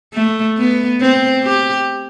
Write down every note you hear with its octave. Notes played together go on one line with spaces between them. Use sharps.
A3
B3
C4
G4